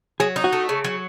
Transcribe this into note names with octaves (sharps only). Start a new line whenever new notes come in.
F#3 G#4
D#4
F#4
A3
C#3
F#3